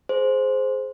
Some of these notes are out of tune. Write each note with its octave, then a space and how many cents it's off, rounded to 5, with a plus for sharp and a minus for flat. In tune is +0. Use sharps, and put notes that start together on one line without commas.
G#4 +20 C5 +0